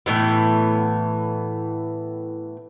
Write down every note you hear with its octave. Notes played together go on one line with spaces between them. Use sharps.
A2 E3 B3